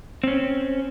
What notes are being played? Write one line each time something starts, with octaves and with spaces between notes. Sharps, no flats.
C4 C#4